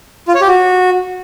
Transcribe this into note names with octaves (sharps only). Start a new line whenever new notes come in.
F4
C#5
G4
F#4